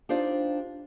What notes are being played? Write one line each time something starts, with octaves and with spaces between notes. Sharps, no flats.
D4 D#4 F4 G4 C5 D5